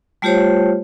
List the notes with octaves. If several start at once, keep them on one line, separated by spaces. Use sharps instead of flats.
G3 A3 F4 G4 C5 C#5